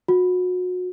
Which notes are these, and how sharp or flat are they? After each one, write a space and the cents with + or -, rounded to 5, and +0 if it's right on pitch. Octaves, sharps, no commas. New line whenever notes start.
F#4 -30